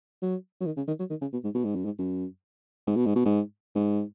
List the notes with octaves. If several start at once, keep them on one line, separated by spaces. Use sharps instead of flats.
F#3
F#3
D#3
C#3
D#3
F#3
D#3
C#3
B2
G#2
B2
G#2
F#2
G#2
F#2
G#2
B2
G#2
B2
G#2
G#2